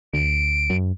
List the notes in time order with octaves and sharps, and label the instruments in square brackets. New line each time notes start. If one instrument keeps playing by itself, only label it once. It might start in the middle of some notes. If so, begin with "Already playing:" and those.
[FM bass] D2 [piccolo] D7
[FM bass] F#2